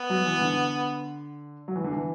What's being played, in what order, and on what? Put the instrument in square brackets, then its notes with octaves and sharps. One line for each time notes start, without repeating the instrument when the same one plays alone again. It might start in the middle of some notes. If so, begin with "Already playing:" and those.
Already playing: [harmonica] B3
[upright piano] F#3
E3
D3
F#3
E3
D3
E3